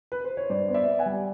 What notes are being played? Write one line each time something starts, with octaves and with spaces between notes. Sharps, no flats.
B4
C5
C#5
G2 C5 D5
B3
D5 E5
B3
F#5 G#5
G3